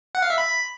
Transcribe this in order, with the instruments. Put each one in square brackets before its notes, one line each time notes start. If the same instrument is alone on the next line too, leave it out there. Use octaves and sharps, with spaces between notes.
[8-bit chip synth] F#5
F5
E5
B5